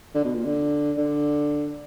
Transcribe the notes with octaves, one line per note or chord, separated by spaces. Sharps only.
D3
B2
A#2
D3
D3